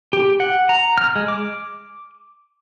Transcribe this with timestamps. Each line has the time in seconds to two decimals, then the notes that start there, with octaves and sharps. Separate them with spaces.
0.13 G4
0.40 F#5
0.69 A#5
0.98 F6
1.16 G#3
1.28 D6